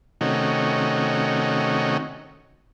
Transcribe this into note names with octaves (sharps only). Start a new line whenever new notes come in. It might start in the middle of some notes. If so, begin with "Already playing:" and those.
C3 D#3 A3 C#4 D#4 F#4